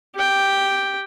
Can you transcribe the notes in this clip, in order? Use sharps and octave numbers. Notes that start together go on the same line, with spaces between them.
G4 G5